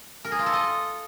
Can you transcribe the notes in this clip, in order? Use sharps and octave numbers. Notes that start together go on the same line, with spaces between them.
A#4
G#4
F4
A4
D#5